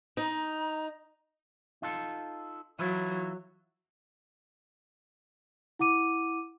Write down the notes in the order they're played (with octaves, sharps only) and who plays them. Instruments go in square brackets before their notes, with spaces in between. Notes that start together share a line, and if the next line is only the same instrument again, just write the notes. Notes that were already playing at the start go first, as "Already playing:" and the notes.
[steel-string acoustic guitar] D#4 [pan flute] A#5
[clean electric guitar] D#4 F4 A4
[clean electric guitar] E3 E4 F4 [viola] F#3
[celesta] E4 F#5 D6 D#7